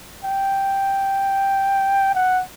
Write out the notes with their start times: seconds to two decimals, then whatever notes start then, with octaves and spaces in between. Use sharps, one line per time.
0.25 G5
2.15 F#5